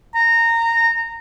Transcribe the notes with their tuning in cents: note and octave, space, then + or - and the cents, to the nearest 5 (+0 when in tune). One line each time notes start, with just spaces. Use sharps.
A#5 -20